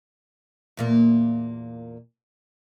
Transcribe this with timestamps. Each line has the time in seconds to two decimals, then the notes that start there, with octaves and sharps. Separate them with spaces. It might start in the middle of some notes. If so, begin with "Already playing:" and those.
0.77 E2 A#2 A#3